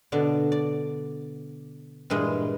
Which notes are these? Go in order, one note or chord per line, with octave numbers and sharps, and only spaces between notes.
B2 D3 D5
D5
G2 A#2 E3 G#3